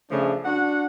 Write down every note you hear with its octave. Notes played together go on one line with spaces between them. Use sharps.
C#3 F3 A3 D4
D4 F#4 F#5